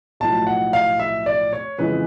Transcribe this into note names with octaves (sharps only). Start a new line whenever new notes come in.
B1 A2 F3 A5
F#5
F5
E5
D5
C#5
F2 C#3 E3 G#3 B4